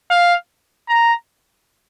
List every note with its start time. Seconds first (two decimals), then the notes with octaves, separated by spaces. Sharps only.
0.10 F5
0.89 A#5